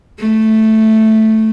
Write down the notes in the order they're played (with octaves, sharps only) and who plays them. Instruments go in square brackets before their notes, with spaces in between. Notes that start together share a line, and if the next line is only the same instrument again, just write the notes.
[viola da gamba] A3